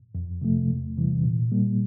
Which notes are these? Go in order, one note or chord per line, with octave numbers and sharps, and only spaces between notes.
F2
C3 F3 A3
E2
C3 E3 G3
A#2
G3 A#3